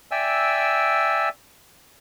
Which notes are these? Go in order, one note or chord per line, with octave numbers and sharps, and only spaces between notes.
D5 E5 G5 G#5 E6